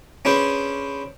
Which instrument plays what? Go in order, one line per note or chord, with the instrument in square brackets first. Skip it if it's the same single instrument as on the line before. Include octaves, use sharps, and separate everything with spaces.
[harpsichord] C#4 D4 G#4 B4 C5